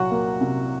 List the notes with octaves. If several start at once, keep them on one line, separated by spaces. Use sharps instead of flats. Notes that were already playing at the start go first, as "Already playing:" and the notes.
Already playing: C2 A#2 F#3 F#4 F#5
A#3
C3